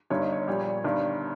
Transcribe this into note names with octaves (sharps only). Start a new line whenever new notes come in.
G1 G2 D#3 C#5
D#5
C#5
A#1 A#2 G3
G1 G2 D#3 G3